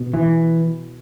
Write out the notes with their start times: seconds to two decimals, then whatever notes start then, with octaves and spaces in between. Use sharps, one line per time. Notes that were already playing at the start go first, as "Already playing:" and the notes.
Already playing: B2
0.14 E3